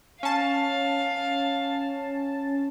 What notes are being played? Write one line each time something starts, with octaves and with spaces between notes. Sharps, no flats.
C#4 F5 A5